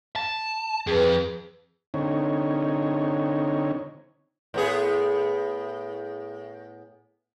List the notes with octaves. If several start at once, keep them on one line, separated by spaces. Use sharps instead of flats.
A5
F2 G#4 B4
D3 C4 D#4 C#5
A2 B3 G#4